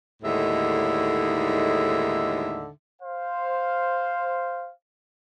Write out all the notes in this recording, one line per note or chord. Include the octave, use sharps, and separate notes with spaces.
D#2 A2 D3 G#3 D#4 E5
C5 F5